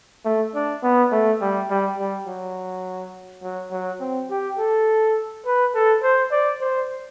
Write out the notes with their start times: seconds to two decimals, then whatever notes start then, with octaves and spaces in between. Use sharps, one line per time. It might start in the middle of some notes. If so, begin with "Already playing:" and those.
0.25 A3
0.55 D4
0.83 B3
1.12 A3
1.41 G3
1.70 G3
1.98 G3
2.27 F#3
3.43 F#3
3.71 F#3
4.00 C4
4.30 G4
4.59 A4
5.46 B4
5.74 A4
6.03 C5
6.32 D5
6.61 C5